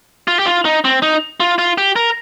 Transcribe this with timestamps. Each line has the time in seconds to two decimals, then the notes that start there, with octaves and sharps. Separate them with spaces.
0.28 F4
0.39 G4
0.46 F4
0.65 D#4
0.85 C4
1.02 D#4
1.40 F4
1.58 F4
1.78 G4
1.96 A#4